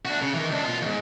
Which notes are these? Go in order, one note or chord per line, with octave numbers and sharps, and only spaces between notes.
D4 F#4
C#3
D#3 E3
C#2 D4
B2 F4
D#2 G#2